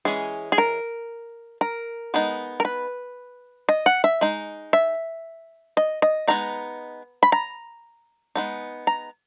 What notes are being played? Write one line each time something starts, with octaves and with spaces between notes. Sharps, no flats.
E3 G#3 C#4 G#4
G#4
A#4
A#4
G#3 B3 D#4
A#4
B4
D#5
F#5
E5
G#3 D#4
E5
D#5
D#5
G#3 B3 D#4 A#5
B5
A#5
G#3 B3 D#4
A#5